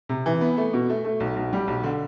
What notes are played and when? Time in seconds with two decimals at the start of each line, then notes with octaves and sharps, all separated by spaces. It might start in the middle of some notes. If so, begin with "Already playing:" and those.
0.09 C3
0.26 E3
0.41 B3
0.57 A3
0.73 B2
0.89 A3
1.05 A3
1.20 B1
1.36 B1
1.53 G3
1.67 B1
1.83 D3